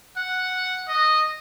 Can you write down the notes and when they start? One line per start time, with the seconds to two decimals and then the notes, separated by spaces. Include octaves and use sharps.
0.17 F#5
0.88 D#5